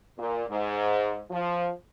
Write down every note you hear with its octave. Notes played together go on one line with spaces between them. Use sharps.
A#2
G#2
F3